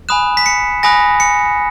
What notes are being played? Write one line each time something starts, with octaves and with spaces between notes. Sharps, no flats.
G#5 B5 D#6 F#6 E7
B6
C#7
G#5 B5 D#6 F#6 A#6
C#7